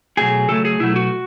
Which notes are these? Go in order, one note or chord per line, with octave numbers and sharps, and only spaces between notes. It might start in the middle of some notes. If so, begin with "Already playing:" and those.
B2 F#3 A3 G#4
C#3 F#3 A3 A4
G#4
B2 F#3 A3 E4
F#4